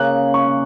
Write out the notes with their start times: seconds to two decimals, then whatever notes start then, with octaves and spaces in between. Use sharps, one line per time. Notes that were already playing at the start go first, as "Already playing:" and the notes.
Already playing: C#3 A#3 C#4 G#4 F#6
0.34 C#6